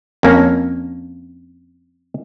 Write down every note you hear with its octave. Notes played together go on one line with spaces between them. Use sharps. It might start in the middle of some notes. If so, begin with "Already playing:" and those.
F2 A#3 C#4